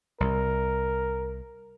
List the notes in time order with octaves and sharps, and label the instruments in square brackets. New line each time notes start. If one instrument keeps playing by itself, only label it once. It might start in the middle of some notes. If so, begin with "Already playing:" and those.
[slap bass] C2 [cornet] A#4